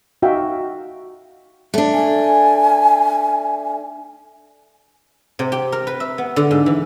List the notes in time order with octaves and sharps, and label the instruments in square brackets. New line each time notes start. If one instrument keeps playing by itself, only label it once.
[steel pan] D#4 F#4 E5 F5 G5
[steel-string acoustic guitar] A3 D4
[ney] G#5
[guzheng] C3
G4
A#4
B4
E5
B3
D3
G#2
E3